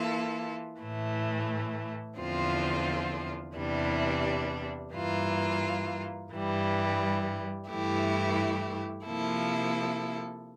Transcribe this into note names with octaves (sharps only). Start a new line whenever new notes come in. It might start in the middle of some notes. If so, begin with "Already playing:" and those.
Already playing: E3 A#3 F4 A4
A2 E3 A3
E2 D3 F3 C4 F4
E2 C3 E3 G3 D4
G2 E3 A#3 F4
G2 E3 G3
G2 E3 A3 E4 G4
C3 F3 A#3 E4 A4